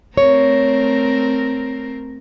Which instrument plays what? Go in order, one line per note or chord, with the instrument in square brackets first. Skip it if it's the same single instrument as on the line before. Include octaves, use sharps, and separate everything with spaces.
[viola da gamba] A3 C4 A#4 [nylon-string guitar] C#5